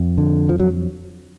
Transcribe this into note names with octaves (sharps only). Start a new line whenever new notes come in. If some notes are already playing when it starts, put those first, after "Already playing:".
Already playing: F2
D3
F3
F#3